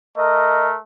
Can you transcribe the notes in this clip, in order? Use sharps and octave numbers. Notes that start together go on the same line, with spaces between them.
A3 A#4 D#5